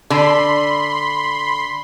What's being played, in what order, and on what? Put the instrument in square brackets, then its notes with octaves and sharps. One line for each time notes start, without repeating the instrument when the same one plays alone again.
[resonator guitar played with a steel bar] D3 [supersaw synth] B5 C6